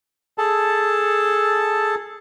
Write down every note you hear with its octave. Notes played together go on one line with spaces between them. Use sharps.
G#4 A4 A5